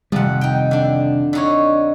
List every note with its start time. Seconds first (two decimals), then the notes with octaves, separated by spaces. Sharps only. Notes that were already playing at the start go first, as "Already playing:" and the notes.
0.12 F2 C3 D#3 G3 F#5
0.41 D#4 G5
0.71 D3 D4
1.33 D3 D#4 C#5